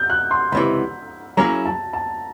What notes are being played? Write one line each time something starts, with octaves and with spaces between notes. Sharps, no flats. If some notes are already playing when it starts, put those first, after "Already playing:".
Already playing: G6
F#6
C6
C#2 C3 E3 B5
F#3 A#3 C#4 E4 G#4 A#5
A5
A5